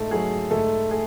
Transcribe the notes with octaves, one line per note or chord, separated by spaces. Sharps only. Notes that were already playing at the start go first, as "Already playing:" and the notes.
Already playing: G#2 A3 A4
F#3 A3 G#4
G#2 A3 A4
A3 G#4